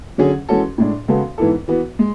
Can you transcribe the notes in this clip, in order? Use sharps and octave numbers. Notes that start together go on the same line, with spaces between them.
D3 F#3 C#4 G#4
E3 G#3 C#4 F#4 A4
A2 G#3 D4
C#3 G#3 B3 F#4 A4
G#2 E3 B3 E4 A4
E3 B3 F#4
G#3